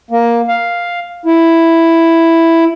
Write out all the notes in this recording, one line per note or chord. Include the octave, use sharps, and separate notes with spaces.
A#3
F5
E4